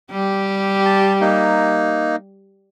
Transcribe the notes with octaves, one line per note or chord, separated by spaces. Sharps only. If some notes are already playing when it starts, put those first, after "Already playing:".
G3 G4
A5
A#3 D#4